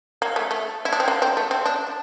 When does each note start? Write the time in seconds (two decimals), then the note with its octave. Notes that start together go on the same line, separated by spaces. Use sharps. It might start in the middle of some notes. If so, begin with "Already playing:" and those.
0.22 A#3
0.36 A3
0.51 A3
0.85 E4
0.93 D4
1.00 C4
1.08 A#3
1.22 C4
1.37 A3
1.51 C4
1.65 D4